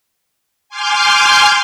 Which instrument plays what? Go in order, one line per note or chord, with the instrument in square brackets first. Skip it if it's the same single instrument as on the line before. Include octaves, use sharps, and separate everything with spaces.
[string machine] G#5 C6 D6 F6 G6